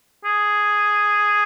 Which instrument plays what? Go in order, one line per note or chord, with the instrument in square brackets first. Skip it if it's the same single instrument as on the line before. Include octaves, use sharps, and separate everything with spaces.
[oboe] G#4